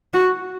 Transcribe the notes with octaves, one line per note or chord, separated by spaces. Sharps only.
F#4